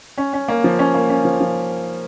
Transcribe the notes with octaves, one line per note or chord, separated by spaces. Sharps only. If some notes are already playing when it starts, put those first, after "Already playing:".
C#4
C#4
A#3
F3
C#4
A#3
C#4
F3
F3